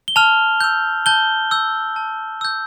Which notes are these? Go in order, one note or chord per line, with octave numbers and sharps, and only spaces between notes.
G7
A5 F6 F7
E6 G6
A5 G6 G7
E6 G6
A5
E6 G6